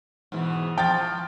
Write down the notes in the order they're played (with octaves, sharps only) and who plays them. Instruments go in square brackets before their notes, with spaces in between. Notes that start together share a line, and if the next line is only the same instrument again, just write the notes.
[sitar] G#2 B2 E3
[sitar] F3 [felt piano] G5 A6